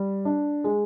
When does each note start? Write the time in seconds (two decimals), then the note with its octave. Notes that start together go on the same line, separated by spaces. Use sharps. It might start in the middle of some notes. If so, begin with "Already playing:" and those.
Already playing: G3
0.25 D4
0.64 G#3